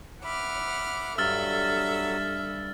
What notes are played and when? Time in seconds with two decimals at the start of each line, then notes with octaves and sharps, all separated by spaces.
0.24 E5 F#5 B5 D6 F6
1.18 G2 F#3 A4 E5 E6 F6 A6